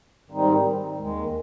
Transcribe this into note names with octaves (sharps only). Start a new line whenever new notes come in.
G#2 D#3 G3 C4 D#4
D#2 D#3 G#3